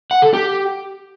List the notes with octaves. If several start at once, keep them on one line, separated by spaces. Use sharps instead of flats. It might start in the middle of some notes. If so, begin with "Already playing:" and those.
F#5
A4
G4